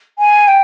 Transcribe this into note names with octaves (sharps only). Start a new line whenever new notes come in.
G#5
G5